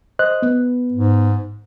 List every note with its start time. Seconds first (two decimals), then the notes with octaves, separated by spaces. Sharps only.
0.19 C5 D#5 F#6
0.42 B3
0.92 G#2